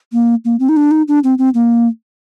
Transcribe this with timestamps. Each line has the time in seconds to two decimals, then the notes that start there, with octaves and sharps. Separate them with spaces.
0.13 A#3
0.45 A#3
0.60 C4
0.69 D#4
0.77 D4
0.91 D#4
1.08 D4
1.24 C4
1.38 C4
1.54 A#3